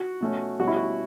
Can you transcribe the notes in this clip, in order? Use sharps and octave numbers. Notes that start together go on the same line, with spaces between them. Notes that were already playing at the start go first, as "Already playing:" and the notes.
Already playing: F#4
B2 A3 C#4
B2 G3 C#4 F#4
E4
F#4